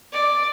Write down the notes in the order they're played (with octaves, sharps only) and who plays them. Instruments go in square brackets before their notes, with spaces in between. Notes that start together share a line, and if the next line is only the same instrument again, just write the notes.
[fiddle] D5